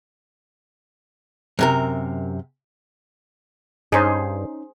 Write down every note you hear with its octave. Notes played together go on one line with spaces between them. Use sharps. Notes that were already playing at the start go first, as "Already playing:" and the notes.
F#2 C3 A#4
G2 C#4 D#4 G#4 C5